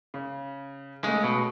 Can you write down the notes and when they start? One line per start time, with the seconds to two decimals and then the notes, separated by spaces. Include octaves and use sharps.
0.14 C#3
1.04 C#3 G#3 A3
1.24 B2